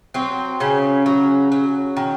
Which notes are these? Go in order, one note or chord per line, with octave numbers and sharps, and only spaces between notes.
F#3 C4
C#3 C#4
F#3
F#3
D#3